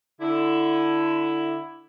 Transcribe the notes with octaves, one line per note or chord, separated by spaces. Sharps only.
D3 E4